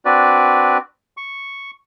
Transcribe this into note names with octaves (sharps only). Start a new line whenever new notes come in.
C4 D4 F#4 B4 D5
C#6